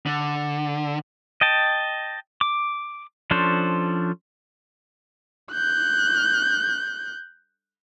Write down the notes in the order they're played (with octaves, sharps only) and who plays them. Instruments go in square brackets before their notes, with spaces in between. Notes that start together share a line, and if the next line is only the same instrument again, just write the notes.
[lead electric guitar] D3
[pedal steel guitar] D#5 G5 A5
D6
F3 C#4 D4 A4 C5
[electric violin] F#6 G6